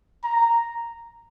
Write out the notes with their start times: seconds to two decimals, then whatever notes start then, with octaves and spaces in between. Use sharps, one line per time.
0.24 A#5